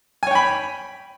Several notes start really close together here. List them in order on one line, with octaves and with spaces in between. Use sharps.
G#5 C#5 G5 B5